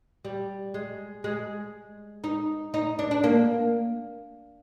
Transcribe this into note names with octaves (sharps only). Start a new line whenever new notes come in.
G3
G#3
G#3
D#4
D#4
D4
D4
A#3